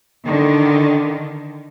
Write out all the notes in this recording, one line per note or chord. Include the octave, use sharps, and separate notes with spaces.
D3 D#3